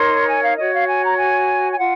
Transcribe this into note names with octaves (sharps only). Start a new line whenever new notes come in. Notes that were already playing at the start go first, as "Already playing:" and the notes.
Already playing: D#4 A#4 C#5 C6
G#5
F5
F#4 C#5 D#5
F5
G#5
A#5
G#5
G#5
F4 F#5